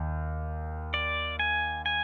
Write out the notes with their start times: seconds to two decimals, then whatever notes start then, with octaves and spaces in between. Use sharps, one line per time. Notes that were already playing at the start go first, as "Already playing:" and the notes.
Already playing: D#2
0.94 D5
1.39 G#5
1.86 G#5